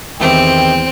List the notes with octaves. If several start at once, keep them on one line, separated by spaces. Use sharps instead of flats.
E2 D#3 E3 C4 G4 G5